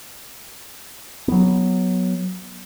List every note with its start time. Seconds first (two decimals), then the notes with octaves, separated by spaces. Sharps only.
1.28 F#3 B3